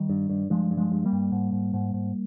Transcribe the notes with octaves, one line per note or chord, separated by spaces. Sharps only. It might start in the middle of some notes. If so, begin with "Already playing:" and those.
Already playing: D#3 G3
G2
G2
G2 F3 G#3
G2
F3 G#3
G2
G3 A#3
G2
G#2
G#2
G#2
G#2